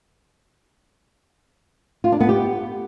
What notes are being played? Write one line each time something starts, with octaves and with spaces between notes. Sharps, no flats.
F4
D4
B3
G4